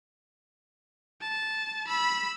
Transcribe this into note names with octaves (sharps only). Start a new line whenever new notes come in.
A5
B5 E6